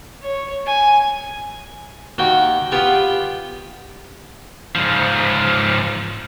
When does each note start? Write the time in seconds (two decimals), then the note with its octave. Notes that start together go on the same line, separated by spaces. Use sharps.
0.23 C#5
0.67 G#5
2.18 D#2 F#4 G5
2.71 B3 F4 G4 C#6 D6
4.75 G#2 F3